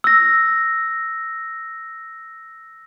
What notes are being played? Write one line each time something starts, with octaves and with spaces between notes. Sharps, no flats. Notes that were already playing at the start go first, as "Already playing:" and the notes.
E6 A#6